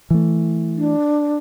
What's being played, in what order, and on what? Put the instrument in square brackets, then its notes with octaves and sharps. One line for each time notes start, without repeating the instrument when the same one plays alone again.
[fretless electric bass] E3 A3
[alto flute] D4